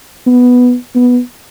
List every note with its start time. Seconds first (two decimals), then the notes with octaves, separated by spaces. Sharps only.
0.27 B3
0.95 B3